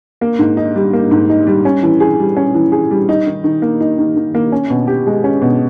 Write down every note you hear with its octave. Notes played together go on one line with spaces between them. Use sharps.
A#3
G#2
D#4
G3
A#3
G#2
D#4
G3
C#4
E3
G#4
G3
C#4
E3
G#4
G3
D#4
D#3
D#3
A#3
D#4
D#3
D#3
A#3
C#4
B2
G4
G#3
C#4
B2